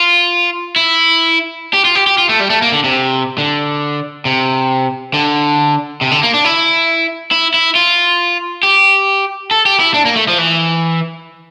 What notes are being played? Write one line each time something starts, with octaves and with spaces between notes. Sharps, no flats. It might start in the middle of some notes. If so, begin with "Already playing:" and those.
Already playing: F4
E4
G4
F4
G4
G4
F4
A3
G3
A3
A#3
D3
C3
D3
C3
D3
C3
D3
A#3
D4
E4
E4
E4
F4
G4
A4
G4
E4
D4
A#3
A3
F3
E3